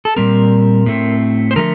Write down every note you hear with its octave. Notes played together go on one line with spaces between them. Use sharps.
A4
A#2 G3 C4 A#4
A2 A3 C4
C5
D3 F3 A3 A#4